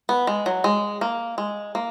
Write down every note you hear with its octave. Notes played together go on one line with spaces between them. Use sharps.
B3
G#3
F#3
G#3
A#3
G#3
A#3